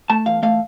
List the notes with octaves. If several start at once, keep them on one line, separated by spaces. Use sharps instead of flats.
A3 A5
E2 F5
A3 F5